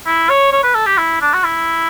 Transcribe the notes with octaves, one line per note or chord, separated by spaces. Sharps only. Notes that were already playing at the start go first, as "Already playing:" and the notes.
E4
C#5
C#5
B4
A4
G4
E4
D4
F#4
E4